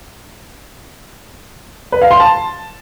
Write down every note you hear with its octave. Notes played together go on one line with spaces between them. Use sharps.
B4
F5
C6
A5